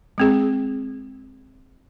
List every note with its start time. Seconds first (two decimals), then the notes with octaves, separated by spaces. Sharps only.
0.18 G#3 C4 G#4